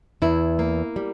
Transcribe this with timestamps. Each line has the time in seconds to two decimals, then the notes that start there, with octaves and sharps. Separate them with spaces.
0.22 E2 E4
0.59 A#3
0.96 G3